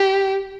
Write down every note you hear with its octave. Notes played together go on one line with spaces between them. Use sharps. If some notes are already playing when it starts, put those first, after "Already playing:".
Already playing: G4